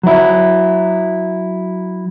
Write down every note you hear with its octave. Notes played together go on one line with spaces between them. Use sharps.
F#3 E4